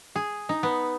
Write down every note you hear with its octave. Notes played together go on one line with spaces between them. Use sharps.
G#4
D#4
B3